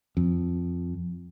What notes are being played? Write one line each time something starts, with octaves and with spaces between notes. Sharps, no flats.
F2